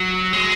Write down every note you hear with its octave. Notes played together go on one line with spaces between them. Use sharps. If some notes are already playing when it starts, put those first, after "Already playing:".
Already playing: F#3
G#3